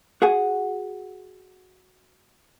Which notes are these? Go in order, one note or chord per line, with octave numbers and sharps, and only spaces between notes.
F#4 G#4 F#5 G#5